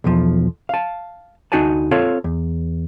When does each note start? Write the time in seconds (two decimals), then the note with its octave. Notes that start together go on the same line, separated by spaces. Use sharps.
0.04 B1 E2 F3
0.69 F5 A5
1.52 D2 D#4 F#4 D5 G#5 A5
1.91 C4 F4 A4 C#5 F5
2.24 E2